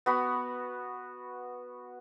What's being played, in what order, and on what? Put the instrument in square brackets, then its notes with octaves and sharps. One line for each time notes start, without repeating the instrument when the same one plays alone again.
[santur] B3 F#4 B5